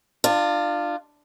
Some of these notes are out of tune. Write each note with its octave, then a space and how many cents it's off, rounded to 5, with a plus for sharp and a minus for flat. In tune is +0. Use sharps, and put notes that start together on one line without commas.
D4 +30 F4 +0